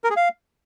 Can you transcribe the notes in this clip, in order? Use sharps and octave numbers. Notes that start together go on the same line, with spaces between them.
A#4
G#4
F5